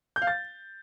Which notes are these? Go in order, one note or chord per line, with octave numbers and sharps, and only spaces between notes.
G6
F5
A6